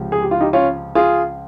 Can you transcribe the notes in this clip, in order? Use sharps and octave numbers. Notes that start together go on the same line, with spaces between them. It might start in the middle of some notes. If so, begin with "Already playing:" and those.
Already playing: C#2 C3 F3
G#4
G4
F4
D#4 G4
C#4 F4
F4 G#4